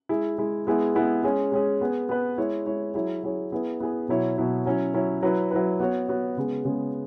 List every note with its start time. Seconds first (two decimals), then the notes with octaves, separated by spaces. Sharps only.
0.09 G#3 E4 G#4
0.38 G#3 E4 G#4
0.67 G#3 B3 E4 G#4
0.95 G#3 B3 E4 G#4
1.23 G#3 C#4 G#4
1.52 G#3 C#4 G#4
1.81 B3 G#4 B4
2.09 B3 G#4 B4
2.38 G#3 E4 C#5
2.66 G#3 E4 C#5
2.94 F#3 E4 G#4 C#5
3.23 F#3 E4 G#4 C#5
3.52 B3 E4 G#4 B4
3.80 B3 E4 G#4 B4
4.08 B2 F#3 E4 C#5
4.37 B2 F#3 E4 C#5
4.66 F#3 C#4 E4 C#5
4.94 F#3 C#4 E4 C#5
5.23 F#3 E4 B4
5.51 F#3 E4 B4
5.80 B3 F#4 C#5
6.08 B3 F#4 C#5
6.37 C#3 G#3 B3 G#4
6.65 C#3 G#3 B3 G#4